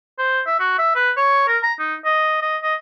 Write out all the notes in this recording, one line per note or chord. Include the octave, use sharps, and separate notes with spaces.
C5
E5
F#4
E5
B4
C#5
A#4
A#5
D#4
D#5
D#5
D#5